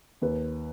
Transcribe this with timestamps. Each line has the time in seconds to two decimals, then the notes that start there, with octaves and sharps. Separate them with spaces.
0.22 D#2 B4